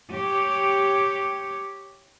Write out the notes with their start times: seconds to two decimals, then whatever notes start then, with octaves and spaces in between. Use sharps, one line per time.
0.10 G4 C#5